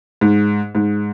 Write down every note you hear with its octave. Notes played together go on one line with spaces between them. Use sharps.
G#2
G#2